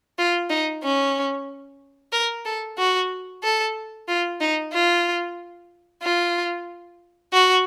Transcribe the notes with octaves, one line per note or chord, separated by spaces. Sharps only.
F4
D#4
C#4
A#4
A4
F#4
A4
F4
D#4
F4
F4
F#4